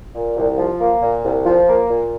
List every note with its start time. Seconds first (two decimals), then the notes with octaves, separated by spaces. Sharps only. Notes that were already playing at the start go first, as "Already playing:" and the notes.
0.15 A#2
0.37 C2
0.58 F3
0.81 A#3
1.02 A#2
1.25 C2
1.46 F3
1.68 A#3
1.90 A#2